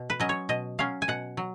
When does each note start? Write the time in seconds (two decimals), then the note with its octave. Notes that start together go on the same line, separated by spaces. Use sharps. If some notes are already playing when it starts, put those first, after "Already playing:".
Already playing: B2
0.10 B4
0.20 F#3 C#4 D#5
0.29 C#5
0.49 B2 D#5
0.79 F#3 C#4 F5
1.02 G#5
1.08 B2 F#5
1.37 F#3